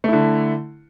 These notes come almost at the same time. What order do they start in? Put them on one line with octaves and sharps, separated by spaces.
A3 E4 D3